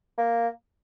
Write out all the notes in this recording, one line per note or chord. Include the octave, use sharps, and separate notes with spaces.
A#3